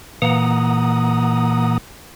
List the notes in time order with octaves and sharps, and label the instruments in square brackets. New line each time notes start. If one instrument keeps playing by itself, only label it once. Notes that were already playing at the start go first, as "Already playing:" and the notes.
[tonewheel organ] A#2 E3 A#3 F#5 A#5 D#6